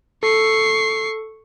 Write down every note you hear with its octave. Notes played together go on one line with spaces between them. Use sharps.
A4 C#6 C7